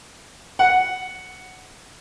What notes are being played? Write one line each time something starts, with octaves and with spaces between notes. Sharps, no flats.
F#5